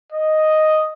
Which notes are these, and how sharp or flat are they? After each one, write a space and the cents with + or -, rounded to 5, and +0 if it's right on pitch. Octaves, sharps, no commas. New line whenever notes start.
D#5 +0